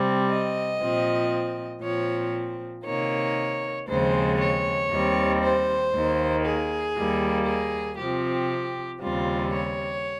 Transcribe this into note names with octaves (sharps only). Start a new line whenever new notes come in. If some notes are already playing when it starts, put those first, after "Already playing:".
Already playing: C3 G3 C4
D#5
A#2 F3 C4
A#2 F3 C4 C#5
C3 D#3 A#3 C#5
D#2 C#3 F3 G#3 C4 C5
C#5
D#2 D#3 G3 C4
C5
D#2 D#3 A#3
G#4
D#2 D#3 G3 A#3
G#4
C3 F3 C4 G4
D#2 C#3 G3 C4 F4
C#5